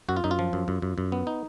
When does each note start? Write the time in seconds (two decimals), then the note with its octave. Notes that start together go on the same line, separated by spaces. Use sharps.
0.09 F#2 F#4
0.17 F4
0.24 F#2 D#4
0.31 F4
0.39 F3
0.53 F#2
0.68 F#2
0.82 F#2
0.98 F#2
1.12 B3
1.27 D#4